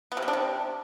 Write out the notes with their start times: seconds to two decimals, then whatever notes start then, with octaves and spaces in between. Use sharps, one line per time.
0.12 B3
0.17 C3
0.22 G3
0.28 D4
0.33 C3